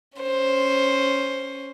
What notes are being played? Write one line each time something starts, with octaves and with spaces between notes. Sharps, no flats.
C#4 C5